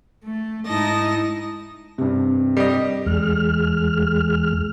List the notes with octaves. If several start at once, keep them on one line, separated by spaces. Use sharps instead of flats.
A3
G#2 D#4 E4 D#5 A5 A#6
G2 C3
G3 D#5
E2 G#3 F6